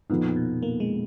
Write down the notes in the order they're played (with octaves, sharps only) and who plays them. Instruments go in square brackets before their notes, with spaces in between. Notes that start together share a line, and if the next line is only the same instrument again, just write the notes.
[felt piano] F2 F3 B3 D#4 [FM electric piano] G#2
[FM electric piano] A#2
B2
A#3
G#3